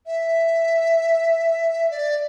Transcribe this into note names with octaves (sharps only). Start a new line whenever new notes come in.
E5
D5